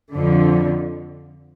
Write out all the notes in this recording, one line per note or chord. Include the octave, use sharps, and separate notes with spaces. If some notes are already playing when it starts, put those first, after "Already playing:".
F2 D3 F3